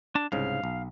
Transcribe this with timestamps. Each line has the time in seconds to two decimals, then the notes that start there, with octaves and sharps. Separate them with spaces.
0.15 D4 A5
0.32 C2 G#2 C#3 F5
0.64 B1